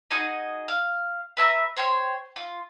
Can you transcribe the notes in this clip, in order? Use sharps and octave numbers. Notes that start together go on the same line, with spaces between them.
D#4 F#4 G#4 D#5
F5
B4 E5 A5 A#5
C5 C#5 G5 C6
F4